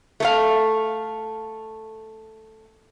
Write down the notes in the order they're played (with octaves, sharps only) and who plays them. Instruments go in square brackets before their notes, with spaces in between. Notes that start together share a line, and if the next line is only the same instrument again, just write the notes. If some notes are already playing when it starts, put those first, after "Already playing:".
[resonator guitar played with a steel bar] A3 A4 F5